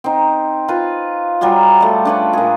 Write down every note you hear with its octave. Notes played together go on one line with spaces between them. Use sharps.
C4 D#4
F4 B4
F#3 G3 F4 G#4
G3 A3
D4 B4 C#5
A#2 G#4